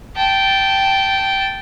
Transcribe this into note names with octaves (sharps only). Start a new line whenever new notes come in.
G5 A5